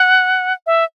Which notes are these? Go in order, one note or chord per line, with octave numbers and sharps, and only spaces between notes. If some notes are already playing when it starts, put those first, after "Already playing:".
Already playing: F#5
E5